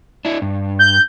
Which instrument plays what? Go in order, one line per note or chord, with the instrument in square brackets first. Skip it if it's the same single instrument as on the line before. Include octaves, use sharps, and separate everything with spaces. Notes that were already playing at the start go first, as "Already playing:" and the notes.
[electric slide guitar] D4 E4
G2
[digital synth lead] G6